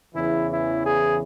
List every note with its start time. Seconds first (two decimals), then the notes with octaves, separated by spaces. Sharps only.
0.12 E2 C#3 E3 E4
0.49 E4
0.83 G#4